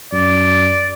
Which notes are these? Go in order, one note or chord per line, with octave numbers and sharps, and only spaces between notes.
F#2 D5